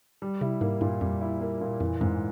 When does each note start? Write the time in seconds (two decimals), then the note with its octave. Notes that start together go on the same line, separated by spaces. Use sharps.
0.22 G3
0.41 C3 E4
0.61 G#2 A#3
0.81 G2 A#2
1.01 F2 G3
1.21 E4
1.41 A#3
1.61 A#2
1.80 F2 E3
2.01 F2 G#2